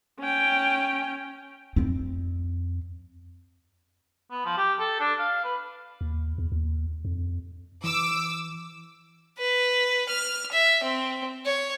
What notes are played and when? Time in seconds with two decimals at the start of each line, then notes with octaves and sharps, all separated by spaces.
0.20 C#4 G5
1.76 F2 C4
4.31 B3
4.45 F3
4.58 G4
4.79 A4
5.00 D4
5.19 F5
5.44 B4
6.01 D#2
6.38 E2
6.52 D#2
7.05 F2
7.84 E3 D6 E6
9.38 B4
10.09 F6
10.52 E5
10.83 C4
11.46 C#5